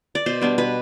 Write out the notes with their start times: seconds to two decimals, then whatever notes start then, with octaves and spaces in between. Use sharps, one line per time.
0.15 D5
0.26 B2 C5
0.41 G3 B3 D4
0.58 B2 B4